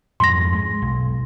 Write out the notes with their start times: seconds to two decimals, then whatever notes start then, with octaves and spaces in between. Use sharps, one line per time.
0.20 F2 G#2 C6 A#6
0.55 G#3
0.82 B1